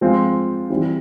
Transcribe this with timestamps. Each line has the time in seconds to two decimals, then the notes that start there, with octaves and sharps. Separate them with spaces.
0.01 F3 G#3 C4 F4
0.70 E3 G3 C4 E4